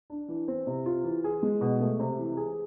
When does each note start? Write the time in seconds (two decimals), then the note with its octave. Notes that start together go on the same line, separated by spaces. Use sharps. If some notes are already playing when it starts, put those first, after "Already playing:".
0.10 D4
0.28 E3
0.48 C4
0.67 C3
0.86 F4
1.04 E3
1.24 G#4
1.43 G#3
1.61 B2
1.81 A3
1.99 C3
2.18 E3
2.37 G#4